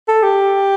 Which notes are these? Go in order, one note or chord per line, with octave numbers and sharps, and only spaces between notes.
A4
G4